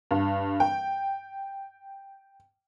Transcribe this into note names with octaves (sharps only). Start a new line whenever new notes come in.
G2
G5